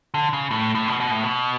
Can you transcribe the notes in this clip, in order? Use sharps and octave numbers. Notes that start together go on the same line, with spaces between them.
D3
C#3
A2
A2
B2
B2
A2
B2